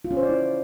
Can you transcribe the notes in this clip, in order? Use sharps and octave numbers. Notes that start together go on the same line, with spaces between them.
F4
C#4
C5
D5
E4